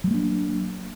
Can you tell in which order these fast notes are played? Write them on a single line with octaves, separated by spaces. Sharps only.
F#3 G#3 A#3 D4